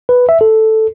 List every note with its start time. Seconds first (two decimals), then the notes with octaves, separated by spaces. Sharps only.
0.09 B4
0.29 E5
0.41 A4